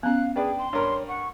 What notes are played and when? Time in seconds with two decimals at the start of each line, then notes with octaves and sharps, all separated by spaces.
0.03 B3 C#4 F5 F#6
0.36 D4 G#4 B4 D5 G5
0.59 C6
0.73 G2 A#4 C#5
1.08 F#5 C#6